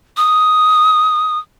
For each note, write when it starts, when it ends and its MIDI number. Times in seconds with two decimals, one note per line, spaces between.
0.17 1.39 87